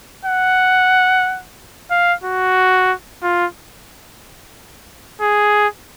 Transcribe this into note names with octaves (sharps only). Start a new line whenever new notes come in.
F#5
F5
F#4
F4
G#4